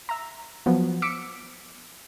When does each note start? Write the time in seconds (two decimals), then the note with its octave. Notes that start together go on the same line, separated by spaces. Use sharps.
0.09 E5 A#5
0.66 F3 F#3 B3
1.02 D6 E6 B6 C#7 D7